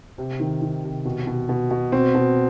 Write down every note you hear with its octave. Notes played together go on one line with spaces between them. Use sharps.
C3
D#3
D#3
C3
B2
B2
B2
B2
B2 C4
B2